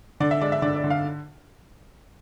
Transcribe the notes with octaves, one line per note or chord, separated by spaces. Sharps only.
D3 D5
E5
G#3 D5
E5
D3 D5
D5
D3
F5